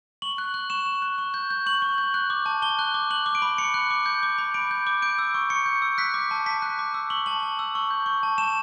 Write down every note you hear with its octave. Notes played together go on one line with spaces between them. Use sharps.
C#6 F#7
F#6
F#6
C#6 E7
C#6
F#6
C#6
G6
G6
C#6 F#7
C#6
G6
F#6
D6
A5
A5 G7
F#6
D6
F#6 F#7
D6
D7
B5
B5 C#7
F#6
D6
G6
D6
B5
B5 D7
G6
D6
G6 D7
E6
C#6
C#6 C#7
G6
E6
F#6 B6
D6
A5
A5 B6
F#6
D6
E6
C#6 F#7
A5 F#7
A5
E6
C#6
G6
C#6
A5
A5 E7